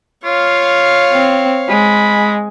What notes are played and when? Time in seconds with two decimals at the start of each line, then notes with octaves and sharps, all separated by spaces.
0.25 F4 C#5 F5
1.13 C4
1.69 G#3 B5